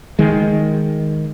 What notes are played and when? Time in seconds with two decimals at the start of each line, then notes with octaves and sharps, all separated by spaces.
0.19 D#3 G#3